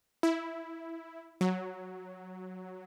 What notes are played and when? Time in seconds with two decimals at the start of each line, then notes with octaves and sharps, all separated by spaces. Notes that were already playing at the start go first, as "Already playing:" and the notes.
0.23 E4
1.41 F#3